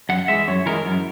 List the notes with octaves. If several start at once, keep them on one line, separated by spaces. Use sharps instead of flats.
F#2 F#5
E3 G#3 E5
F#2 C#5
E3 G#3 A#4
F#2